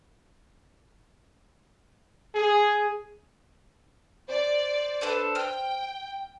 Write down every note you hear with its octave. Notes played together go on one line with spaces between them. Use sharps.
G#4
C5 D5
D4 A4 B4
G5 F6